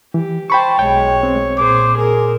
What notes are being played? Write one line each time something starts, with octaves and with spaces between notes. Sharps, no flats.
E3 G4
C5 G5 A5 B5 C#6
B1 G#3 C#5 G5
C4
A#2 G#4 C5 D6
G#4 A#4